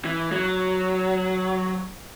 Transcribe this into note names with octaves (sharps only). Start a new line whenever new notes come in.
E3
F#3